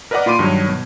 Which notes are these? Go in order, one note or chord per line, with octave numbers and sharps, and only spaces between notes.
A#4 B4 D5 D#5 F#5 D6
A#2 F4 B5 C6 D6 D#7
G2 D#3 F#3 C#5
B2